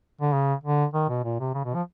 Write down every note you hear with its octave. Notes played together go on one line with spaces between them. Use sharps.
D3
C#3
D3
D#3
B2
A#2
C3
C#3
B2
F3